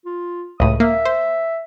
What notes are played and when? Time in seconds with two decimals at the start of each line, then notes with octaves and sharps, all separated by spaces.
0.05 F4
0.60 C#2 A2 D#6
0.80 A#3 E5
1.06 C5